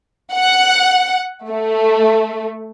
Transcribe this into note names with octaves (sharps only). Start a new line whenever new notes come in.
F#5
A3